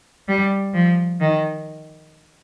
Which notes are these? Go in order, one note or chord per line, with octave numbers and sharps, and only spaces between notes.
G3
F3
D#3